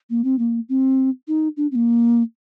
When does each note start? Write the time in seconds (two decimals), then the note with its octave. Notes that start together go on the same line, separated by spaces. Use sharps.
0.10 A#3
0.24 C4
0.39 A#3
0.69 C4
1.28 D#4
1.57 D4
1.72 C4
1.75 A#3